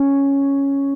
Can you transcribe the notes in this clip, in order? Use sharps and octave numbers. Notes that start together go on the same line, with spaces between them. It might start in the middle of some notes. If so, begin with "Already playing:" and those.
Already playing: C#4